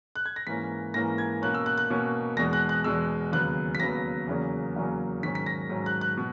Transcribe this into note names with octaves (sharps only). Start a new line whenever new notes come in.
F#6
G#6
A#6
G#2 E3 A#3 C#4 B6
G#2 E3 A#3 C#4 A#6
G#6
B2 A#3 C#4 F#6
E6
F#6
F#6
B2 A#3 C#4
E2 B2 G#3 A#6
F#6
F#6
E2 B2 G#3 E6
D#2 C#3 F#3 B3 F#6
B6
D#2 C#3 F#3 B3 A#6
E2 C#3 F#3 A#3 C#4
E2 C#3 F#3 A#3 C#4
G#2 D#3 F#3 C#4 B6
B6
A#6
G#2 D#3 F#3 C#4
F#6
F#6
B2